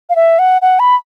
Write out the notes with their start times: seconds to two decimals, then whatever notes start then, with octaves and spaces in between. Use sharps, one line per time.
0.10 F5
0.16 E5
0.39 F#5
0.62 F#5
0.80 B5